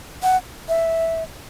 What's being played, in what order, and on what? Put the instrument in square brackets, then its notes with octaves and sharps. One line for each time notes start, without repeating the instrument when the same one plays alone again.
[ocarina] F#5
E5